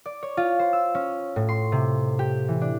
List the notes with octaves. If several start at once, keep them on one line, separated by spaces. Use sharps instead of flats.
D5
C#5
F4
C5
E6
C#4
A2
C6
C3
G4
E3
D4